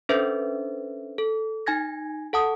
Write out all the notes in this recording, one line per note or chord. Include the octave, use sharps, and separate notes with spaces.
C#4 D4 A4 B4 C5 E5
A4
D#4 G#5 G#6 A#6
A4 F#5 A5 D#6